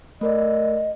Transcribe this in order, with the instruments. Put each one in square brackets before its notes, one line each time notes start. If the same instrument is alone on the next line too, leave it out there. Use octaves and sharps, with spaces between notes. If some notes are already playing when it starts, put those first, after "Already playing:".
[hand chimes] A3 A#4 D5 [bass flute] D#5